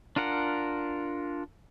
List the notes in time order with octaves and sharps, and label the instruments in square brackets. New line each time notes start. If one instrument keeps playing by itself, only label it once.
[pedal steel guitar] D4 F4 A#4 F#5